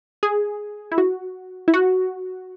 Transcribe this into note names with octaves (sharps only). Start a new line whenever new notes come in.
G#4
E4
F#4
E4
F#4